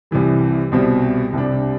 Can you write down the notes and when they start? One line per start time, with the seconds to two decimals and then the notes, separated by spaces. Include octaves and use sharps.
0.11 C2 C3 E3 G3
0.72 C2 B2 G3 C4
1.33 C2 C3 G3 D4